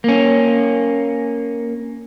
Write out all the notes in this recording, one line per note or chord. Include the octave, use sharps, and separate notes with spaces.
A#3 C#4